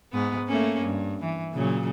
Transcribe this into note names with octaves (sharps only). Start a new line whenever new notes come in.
G#2 B3
A3 A#3 C#4
G2
E3
A#2 C#3 F#3